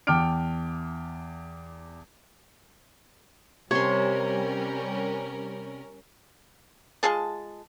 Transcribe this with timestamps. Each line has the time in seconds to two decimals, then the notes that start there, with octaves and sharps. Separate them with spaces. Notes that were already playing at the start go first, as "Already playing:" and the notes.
0.07 E2 G5 A5 D6 F6 D7
3.71 C3 G3 C#4 A#4 C#5 C6
7.03 G#3 F4 G#4 A5